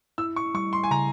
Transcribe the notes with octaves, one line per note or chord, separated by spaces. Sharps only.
E4 E6
C#6
G3 C#6
C6
G#5
C#3 A#5